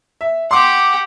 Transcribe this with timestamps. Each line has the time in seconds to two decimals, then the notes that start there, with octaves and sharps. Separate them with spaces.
0.21 E5
0.51 G4 F#5 C6 D6